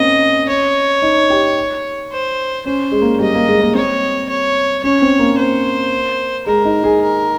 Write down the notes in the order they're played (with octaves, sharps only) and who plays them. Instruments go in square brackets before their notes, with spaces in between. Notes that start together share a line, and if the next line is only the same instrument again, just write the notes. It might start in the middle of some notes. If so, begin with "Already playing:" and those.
Already playing: [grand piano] A#3 C4 C#4 [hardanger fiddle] D#5
[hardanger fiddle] C#5
[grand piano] D#4
G4
[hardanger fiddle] C5
[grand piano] C#4 [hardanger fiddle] C5
[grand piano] G#3
A#3
[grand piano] G3 [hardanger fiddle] D#5
[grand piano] A#3
G#3
A#3
[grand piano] C4 [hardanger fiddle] C#5
[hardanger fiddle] C#5
[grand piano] C#4 [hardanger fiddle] C#5
[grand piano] C4
A#3
[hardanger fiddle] C5
[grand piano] G#3 [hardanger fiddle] A#4
[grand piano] D#4
G#4
[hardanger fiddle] A#4